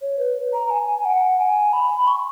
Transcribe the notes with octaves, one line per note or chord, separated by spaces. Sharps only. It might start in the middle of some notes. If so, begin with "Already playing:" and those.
C#5
B4
A#5
G#5
F#5
G#5
B5
C#6